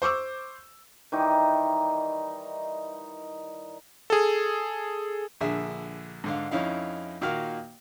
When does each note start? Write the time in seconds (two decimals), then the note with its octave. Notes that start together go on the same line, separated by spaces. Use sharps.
0.02 C5 C#6 D6 E6
1.12 D#3 E3 G3 D#4
4.10 G#4 A4
5.41 A#1 D3 G#4 E5
6.24 G#2 D3 F5
6.51 F2 C#4 D#4 E4 F5
7.21 A#2 D#3 A#3 F#4 F5 F6